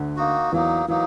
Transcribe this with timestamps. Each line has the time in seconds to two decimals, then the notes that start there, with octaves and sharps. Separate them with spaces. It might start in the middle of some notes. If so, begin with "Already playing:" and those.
Already playing: D2 D3
0.16 A#3 D#4 F#4
0.52 E2 E3 F#3 A#3 D#4
0.88 E3 F#3 A#3 D#4